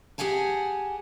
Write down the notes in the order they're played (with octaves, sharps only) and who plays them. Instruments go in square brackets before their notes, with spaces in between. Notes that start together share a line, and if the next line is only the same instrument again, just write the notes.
[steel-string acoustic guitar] G4 G#4 F#5 G#5 A5